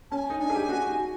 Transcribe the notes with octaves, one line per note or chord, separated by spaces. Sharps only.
C#4 G#5 A5
D#4
D4 G#5
G#4
G4
F#4